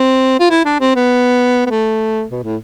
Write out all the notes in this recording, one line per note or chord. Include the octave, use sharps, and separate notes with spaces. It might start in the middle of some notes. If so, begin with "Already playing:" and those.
Already playing: C4
F4
E4
D4
C4
B3
B3
A3
B2
A2